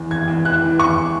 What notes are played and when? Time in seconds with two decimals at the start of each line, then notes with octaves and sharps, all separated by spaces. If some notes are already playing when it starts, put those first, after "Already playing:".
Already playing: E2 E3
0.11 E2 G#6
0.28 E2
0.45 E3 F#6
0.62 E3
0.79 E2 C#6